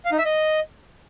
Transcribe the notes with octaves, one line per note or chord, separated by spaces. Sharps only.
F5
D#4
E5
D#5